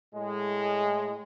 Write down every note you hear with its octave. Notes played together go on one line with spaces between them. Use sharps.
A2 G#3